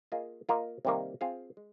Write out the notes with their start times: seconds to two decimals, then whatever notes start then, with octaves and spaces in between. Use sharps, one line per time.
0.12 A#3 F4 G#4 D#5
0.49 A#3 F4 A#4 D#5
0.85 C3 D#3 G3 A#3
1.21 C4 F4 G#4 C5 F5
1.57 G#3